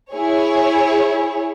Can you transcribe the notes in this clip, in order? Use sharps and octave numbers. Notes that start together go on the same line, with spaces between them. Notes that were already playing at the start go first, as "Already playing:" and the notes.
E4 G#4 C#5